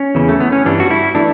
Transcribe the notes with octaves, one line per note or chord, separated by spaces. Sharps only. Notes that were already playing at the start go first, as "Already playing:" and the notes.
Already playing: C#4
E2 C#3 E3
A3
B3
C#4
G2 E3 G3 D4
F#4
E4
E3 A3 D4